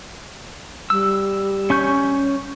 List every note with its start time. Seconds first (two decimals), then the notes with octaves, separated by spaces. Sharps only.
0.90 G3 E6
1.70 C#4 C#6 G6